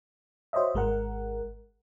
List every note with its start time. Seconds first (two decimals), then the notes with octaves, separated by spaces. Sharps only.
0.53 F#4 C5 C#5 D#5 E5
0.74 G#1 G#3 A#4 F#5